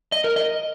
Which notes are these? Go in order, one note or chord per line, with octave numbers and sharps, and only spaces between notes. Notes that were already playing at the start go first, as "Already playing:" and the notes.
D#5
A#4
D#5